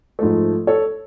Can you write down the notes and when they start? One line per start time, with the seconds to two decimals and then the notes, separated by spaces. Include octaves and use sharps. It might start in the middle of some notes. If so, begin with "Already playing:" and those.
0.19 G#2 F3 A3
0.67 A4 C#5